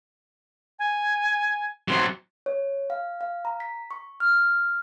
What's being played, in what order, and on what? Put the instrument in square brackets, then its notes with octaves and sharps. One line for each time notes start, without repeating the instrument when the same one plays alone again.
[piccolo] G#5
[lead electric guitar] F#3 C4 [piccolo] C6
[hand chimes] C#5
F5
F5
A#5
B6
C#6
F6